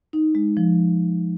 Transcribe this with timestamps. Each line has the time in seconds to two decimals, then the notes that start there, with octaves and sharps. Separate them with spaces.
0.13 D#4
0.35 G#3
0.57 F3